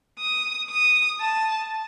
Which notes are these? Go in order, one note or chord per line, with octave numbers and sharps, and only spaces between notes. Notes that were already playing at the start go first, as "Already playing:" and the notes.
D#6
D#6
A5